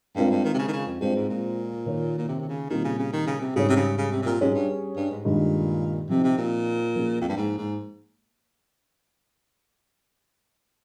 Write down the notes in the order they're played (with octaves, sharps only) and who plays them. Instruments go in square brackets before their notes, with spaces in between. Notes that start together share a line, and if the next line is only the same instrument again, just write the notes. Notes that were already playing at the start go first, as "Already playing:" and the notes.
[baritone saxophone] G2 [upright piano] G#3 C4 F4 A#4
[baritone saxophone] G2
D#3
C3
C#3
D#3
C#3
F2
[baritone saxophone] G2 [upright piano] G#3 C4 F4 G#4 C5
[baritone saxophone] G#2
A#2
[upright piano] D#3 A#3 F4 A#4 C#5
[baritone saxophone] A#2
C3
C3
C#3
[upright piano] A#2 G3 C4 F4 [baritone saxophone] D#3
[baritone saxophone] C#3
C#3
D#3
C#3
C3
[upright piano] G#2 G3 C#4 G#4 C#5 [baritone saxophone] C#3
[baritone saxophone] C3
C#3
C#3
C3
C3
A#2
[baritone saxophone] G#2 [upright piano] G3 C#4 G#4 C#5
[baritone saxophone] G2
G2
G#2
[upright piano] G2 D#3 G#3 [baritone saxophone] A#2
[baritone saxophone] C3 [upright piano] F3 C4 D#4
[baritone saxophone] C3
A#2
[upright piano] F3 A#3 C#4 G#4
[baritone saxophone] F2
G2
G#2
G#2